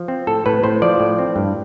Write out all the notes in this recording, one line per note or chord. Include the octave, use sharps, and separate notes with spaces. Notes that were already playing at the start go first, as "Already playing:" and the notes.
Already playing: F3
C4
A2 A4
A2 B4
A2 C5
F3 D5
A2
C4
G2